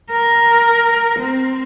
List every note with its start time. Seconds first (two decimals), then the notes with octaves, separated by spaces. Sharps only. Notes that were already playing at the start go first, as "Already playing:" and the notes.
0.11 A#4
1.19 C4